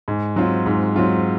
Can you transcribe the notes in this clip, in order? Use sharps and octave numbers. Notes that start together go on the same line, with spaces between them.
G#2
F#3 C4 F4
G#2
F#3 C4 F4